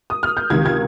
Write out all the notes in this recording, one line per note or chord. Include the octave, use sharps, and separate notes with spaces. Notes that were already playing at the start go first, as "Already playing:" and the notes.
D#6
F6
G6
C#2 C3 D#3 G#6
G#6